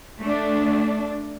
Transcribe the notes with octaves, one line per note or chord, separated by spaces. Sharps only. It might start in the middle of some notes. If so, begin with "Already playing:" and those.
A3 D4